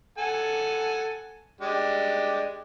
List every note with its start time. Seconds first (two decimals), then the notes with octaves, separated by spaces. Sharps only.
0.18 A4 F#5 G#5
1.61 G#3 D4 G4